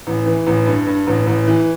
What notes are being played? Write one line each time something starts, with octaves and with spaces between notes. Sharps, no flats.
A1
E3
A1
G2
G2
A1
A1
E3